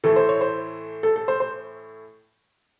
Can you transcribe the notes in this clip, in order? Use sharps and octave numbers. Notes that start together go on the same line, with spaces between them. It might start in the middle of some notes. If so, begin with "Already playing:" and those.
A2 E3 A3 A4
C5
C#5
C5
A4
A4
C5
C5